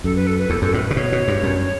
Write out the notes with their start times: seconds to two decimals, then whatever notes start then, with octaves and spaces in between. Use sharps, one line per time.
0.04 F#2 A4
0.16 B4
0.27 A4
0.38 B4
0.50 E2 A4
0.62 F#2 A4
0.73 A2 B4
0.85 B4
0.91 C#3
0.96 B2 C#5
1.12 B2
1.28 G2
1.43 F#2